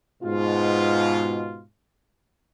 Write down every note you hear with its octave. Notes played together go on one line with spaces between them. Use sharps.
G#2 B2 F4